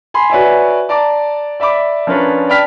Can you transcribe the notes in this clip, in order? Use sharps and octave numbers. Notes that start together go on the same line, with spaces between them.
G#5 B5 C6
F#4 B4 C#5 D5 E5 G#5
D5 A5 A#5 D6
D5 E5 B5 D6
F3 C#4 D4 A#4 B4 C#5
D5 G5 A5 B5 F6 B6